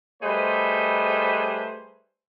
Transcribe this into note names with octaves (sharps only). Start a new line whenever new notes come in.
G3 A3 D#4 G#4 B4 C5